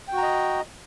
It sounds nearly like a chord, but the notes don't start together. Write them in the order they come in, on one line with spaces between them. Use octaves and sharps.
G5 F#4 A#5 D#5